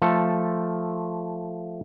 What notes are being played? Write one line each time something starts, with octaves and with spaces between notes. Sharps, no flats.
F3 A3 A4